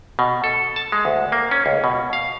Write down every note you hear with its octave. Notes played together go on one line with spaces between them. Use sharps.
B2
A4
A5
G#3
D2
A#3
C#4
C#2
B2
F5